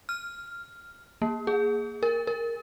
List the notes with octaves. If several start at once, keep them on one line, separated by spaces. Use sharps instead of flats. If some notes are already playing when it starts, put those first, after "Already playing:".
F6
A#3
G#4
A#4
A#4